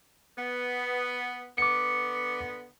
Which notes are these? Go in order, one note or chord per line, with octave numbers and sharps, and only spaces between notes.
B3
D3 B3 D6 C#7